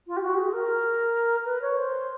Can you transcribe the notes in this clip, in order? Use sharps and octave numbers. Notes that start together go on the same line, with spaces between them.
F4
G4
F#4
G4
G#4
A#4
B4
C#5
C5